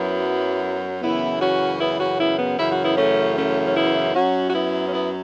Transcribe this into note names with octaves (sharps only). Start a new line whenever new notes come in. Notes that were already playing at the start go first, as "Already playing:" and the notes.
Already playing: F#2 F#3 B3 E4
F#2 C#3 E3 B3 E4
C#4 F#4
B3 E4
C#4 F#4
B3 E4
B3
F#2 C#3 E3 E4
F#4
B3 E4
A3 C#4
A3 C#4
C#4
B3 E4
F#2 F#3 C#4 F#4
F#4
B3 E4
C#4
B3 E4